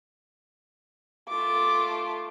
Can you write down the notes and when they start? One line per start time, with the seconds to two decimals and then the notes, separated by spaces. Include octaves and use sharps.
1.29 A3 F4 D6